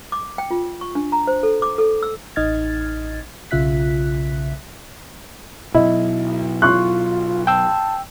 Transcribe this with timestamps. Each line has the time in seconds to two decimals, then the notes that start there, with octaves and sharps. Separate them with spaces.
0.12 D6
0.38 G5
0.51 F4
0.81 C#6
0.95 D4
1.12 A#5
1.27 C5
1.43 A4
1.62 D6
1.78 A4
2.03 E6
2.36 A1 D#4 D#5 F6 G#6 A6
3.51 B1 C#3 F4 E5 F#6 B6
5.75 B2 F#3 E4 D#5
6.62 F4 C6 C#6 F#6
7.47 G5 A5 E6